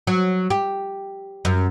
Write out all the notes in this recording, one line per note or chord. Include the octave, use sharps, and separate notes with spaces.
F#3
G4
F#2